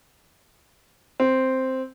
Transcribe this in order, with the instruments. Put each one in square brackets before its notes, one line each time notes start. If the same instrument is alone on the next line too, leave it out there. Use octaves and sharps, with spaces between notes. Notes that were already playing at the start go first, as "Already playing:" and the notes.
[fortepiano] C4